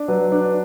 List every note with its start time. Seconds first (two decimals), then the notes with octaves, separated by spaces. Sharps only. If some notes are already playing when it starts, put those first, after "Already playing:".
Already playing: D4
0.08 F#3 B4
0.31 D4 B4